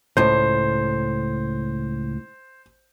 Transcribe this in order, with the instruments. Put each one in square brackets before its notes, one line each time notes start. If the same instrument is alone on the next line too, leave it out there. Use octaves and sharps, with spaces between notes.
[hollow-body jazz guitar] C#2 A2 [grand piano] C5